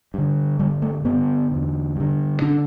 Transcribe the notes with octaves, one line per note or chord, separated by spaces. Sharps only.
G2 D3
G2 D3 G3
A3
G2 D3 B3
E2 D3
G2 D3
D3 D4